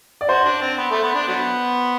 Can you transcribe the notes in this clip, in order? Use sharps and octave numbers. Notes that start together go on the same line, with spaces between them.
D5
F#4 C5
D4
C4
B3
A3
B3
D4
F#3 B3